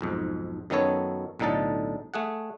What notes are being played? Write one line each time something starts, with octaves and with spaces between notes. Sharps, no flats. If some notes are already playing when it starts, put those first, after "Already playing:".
B1 F2 G#2
F#2 D#3 F#3 B3 A4 C#5
B1 A2 D3 D#4 A4 A5
A3 G#4 F#5